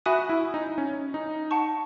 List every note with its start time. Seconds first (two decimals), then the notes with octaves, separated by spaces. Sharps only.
0.06 F#4 E5 G#5 B5 D#6 F#6
0.29 E4
0.54 D#4
0.78 C#4
1.14 D#4
1.51 F#5 A5 C#6